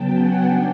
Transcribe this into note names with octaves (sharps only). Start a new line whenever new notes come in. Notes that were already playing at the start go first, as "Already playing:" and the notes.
Already playing: C#3 F#3 B3 G5 A5
F#5 G#5
G3 D4 G5